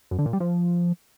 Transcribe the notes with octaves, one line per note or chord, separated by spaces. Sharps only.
F#2
D3
A#2
G3
F3